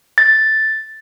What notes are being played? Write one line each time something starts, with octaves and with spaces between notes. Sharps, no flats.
A6